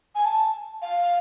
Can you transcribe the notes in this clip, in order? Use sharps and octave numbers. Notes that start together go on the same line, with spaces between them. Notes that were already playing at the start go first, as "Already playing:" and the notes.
G#5
A5
F5